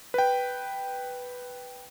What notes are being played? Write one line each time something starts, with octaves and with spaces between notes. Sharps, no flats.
B4 G5